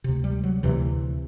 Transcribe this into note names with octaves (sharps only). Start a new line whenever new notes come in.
D2 C3
G3
F#3
D2 C3 E3